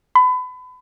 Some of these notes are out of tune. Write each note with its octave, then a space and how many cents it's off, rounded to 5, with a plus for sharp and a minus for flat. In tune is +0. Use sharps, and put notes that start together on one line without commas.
B5 +30